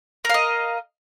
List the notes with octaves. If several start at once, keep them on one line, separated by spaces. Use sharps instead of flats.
A#4 D#5 F5